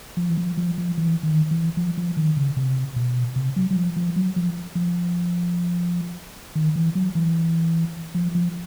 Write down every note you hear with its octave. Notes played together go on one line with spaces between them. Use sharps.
F3
E3
F3
F3
F3
E3
D#3
E3
F3
F3
D#3
C#3
C3
B2
C3
F#3
F#3
F3
F3
F#3
F3
F3
D#3
E3
F#3
E3
F3
F3